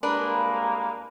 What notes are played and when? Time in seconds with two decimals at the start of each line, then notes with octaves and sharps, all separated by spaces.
0.03 C2 G#3 A#3 D4 B4 A#5 B5